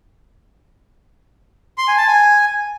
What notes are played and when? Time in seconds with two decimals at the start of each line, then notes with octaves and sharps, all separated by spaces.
1.78 C6
1.88 G#5
1.98 A5
2.08 G#5